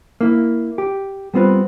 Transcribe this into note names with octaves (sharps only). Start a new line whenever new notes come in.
A#3 E4
G4
G3 B3 C4 F4 B4